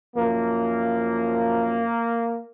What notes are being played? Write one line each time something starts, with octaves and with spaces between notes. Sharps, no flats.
F#2 F3 A#3